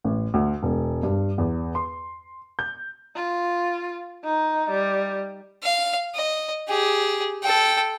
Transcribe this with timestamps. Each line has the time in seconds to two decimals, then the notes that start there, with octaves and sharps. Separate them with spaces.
0.04 A1
0.34 D2
0.63 E1
1.03 G2
1.38 E2
1.75 C6
2.59 G6
3.16 F4
4.24 D#4
4.70 G3
5.63 F5
6.15 D#5
6.68 G4 G#4
7.43 A4 G5